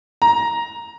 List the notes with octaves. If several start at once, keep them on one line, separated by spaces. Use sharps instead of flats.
A#5